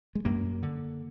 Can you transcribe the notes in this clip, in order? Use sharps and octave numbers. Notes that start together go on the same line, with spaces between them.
G#3
F#2 A#3
D3